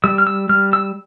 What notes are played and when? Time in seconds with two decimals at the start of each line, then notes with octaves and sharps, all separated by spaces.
0.04 G3 E6
0.18 F6
0.27 E6
0.49 G3 F6
0.73 E6